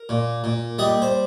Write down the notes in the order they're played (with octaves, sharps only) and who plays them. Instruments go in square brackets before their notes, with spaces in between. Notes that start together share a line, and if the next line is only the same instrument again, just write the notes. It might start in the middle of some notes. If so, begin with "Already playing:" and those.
Already playing: [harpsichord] A#4
A#2
A#2
G3 D#5
C5